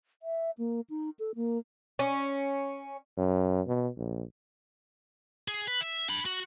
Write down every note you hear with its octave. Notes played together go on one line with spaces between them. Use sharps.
E5
A#3
D#4
A4
A#3
C#4
F#2
B2
A#1
G#4
B4
E5
D4 B5
F#4